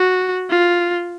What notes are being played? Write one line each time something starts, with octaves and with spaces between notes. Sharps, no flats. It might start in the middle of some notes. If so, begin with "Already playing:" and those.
Already playing: F#4
F4